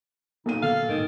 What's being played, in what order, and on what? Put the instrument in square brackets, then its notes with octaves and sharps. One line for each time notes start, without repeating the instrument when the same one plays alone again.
[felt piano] B1 A#2 D#7 [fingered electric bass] A#3 [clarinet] D#4
[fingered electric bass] D3 B3 [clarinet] A4 [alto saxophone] F5
[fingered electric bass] G#2 [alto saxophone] D#3